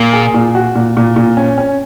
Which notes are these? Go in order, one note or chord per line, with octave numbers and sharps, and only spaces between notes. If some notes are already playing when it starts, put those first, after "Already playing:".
Already playing: A#2 A#3
G#4
A#2
F#4
A#2
A#2
A#2
C#4
C#4